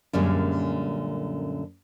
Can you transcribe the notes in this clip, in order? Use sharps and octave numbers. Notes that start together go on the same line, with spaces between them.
F#2 A#2 D3 G3 G#3 C#4